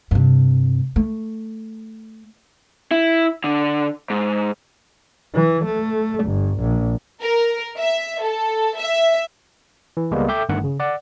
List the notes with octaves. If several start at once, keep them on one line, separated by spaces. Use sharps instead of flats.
G2 C3
A3
E4
D3
G#2
E3
A3
G1
A#1
A#4
E5
A4
E5
E3
C#2 G3 G#3 A#3 B3
A4 E5 G5 D6 G6
G1 G2 D#3 A3 D4 F#5
C#3
D5 F#5